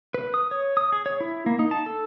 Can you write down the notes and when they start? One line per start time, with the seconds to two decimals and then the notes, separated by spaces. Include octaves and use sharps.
0.14 B4
0.34 D#6
0.51 C#5
0.77 D#6
0.92 G#4
1.06 C#5
1.21 E4
1.46 A#3
1.59 D#4
1.71 A5
1.86 A4